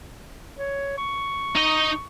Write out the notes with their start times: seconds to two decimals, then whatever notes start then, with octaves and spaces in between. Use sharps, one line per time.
0.57 C#5
0.98 C#6
1.56 D#4 D#5